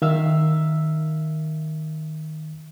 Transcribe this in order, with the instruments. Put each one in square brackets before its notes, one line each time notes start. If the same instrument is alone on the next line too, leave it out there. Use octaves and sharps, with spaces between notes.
[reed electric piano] D#3 E5 F5 E6